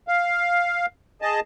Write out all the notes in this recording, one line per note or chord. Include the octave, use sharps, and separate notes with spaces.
F5
G#4 D#5 A5